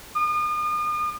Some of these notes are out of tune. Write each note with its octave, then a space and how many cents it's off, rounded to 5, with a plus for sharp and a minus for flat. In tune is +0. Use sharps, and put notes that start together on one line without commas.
D#6 -40